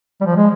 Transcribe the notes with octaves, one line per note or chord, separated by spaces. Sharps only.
G3
F3
G#3